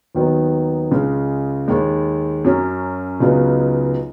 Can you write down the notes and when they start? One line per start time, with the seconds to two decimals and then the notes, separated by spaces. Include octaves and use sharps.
0.15 D#2 D#3 F#3 B3 D#4
0.91 C#2 C#3 G#3
1.68 D#2 D#3 G#3
2.44 F#2 F#3 C#4
3.20 C#2 C#3 F#3 B3 D#4